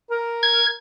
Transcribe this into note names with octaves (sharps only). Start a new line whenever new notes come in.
A#4
G#6